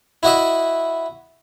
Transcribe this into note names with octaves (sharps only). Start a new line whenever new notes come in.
E4 F#4 D#5 E5